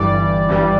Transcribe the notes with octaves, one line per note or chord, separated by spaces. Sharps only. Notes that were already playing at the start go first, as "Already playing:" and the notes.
Already playing: G1 G2 E3 G3 D5
G1 G2 E3 G3